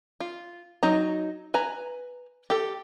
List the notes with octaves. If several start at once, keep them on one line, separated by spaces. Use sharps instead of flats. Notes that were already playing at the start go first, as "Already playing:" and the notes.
F4
F#3 D#4 A#5
B4 G#5 A#5
G4 A4